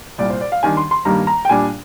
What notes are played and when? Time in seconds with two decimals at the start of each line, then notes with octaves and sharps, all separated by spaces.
0.18 C2 A#2 G3 D5
0.30 C5
0.41 D5
0.52 F5
0.63 D#2 D#3 G3 D4 G#5
0.77 C6
0.91 C6
1.05 G2 D#3 G3 A#3 A#5
1.27 A#5
1.45 G5
1.49 A#2 G3 D4 G#5